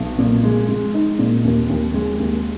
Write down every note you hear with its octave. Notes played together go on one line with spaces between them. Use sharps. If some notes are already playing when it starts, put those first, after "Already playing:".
Already playing: B1
A#2
G#3
G#3
D#4
A#2
D#2
D#2
G#3
D#2